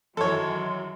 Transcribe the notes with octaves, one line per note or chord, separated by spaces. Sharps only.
F#2 D#3 E3 F#3 G#3 A4 C#5 C6